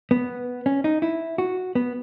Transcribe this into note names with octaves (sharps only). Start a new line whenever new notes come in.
B3
C#4
D#4
E4
F#4
B3